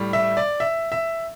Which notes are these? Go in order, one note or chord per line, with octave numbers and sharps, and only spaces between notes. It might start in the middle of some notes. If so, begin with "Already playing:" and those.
Already playing: A2 G3
E5
D5
E5
E5